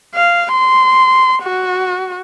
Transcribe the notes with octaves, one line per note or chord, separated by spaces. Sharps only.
F5
C6
F#4